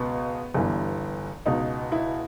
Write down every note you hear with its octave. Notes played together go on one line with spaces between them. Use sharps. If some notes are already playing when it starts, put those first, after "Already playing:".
Already playing: C#2 B2 B3
G1 G2 E3
C#2 B2 D#4
E4